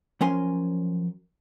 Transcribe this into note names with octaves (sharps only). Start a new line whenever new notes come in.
F3 F#3 C#4 A#4 G#5 C6